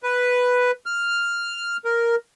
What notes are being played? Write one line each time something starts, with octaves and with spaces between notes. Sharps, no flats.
B4
F6
A#4